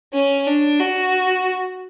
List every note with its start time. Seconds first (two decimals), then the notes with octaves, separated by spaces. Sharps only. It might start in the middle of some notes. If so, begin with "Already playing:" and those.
0.13 C#4
0.47 D4
0.80 F#4